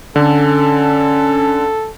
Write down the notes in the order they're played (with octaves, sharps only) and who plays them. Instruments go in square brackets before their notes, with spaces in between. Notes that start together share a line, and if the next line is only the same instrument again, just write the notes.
[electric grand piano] D3 [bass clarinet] C#4 [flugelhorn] A4